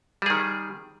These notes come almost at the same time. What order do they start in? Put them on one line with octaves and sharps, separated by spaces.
G3 G#4 D#3